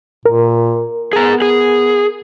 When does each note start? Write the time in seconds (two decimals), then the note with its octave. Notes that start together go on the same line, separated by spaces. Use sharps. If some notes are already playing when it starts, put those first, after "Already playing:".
0.26 A#2 A#4
1.13 B3 G#4 A#5
1.42 G#4